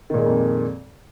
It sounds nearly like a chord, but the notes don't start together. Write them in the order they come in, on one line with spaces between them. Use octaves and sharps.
D#3 A#2 G#3 A#3 F2